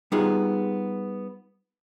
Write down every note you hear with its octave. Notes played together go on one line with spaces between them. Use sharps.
G3 B3 D#4 F4 G#4